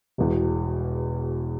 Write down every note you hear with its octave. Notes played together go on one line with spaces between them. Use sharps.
E1 E2 B2